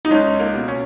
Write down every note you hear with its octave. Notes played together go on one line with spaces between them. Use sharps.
D#4
C#2 C#4
A#3
B2
C#4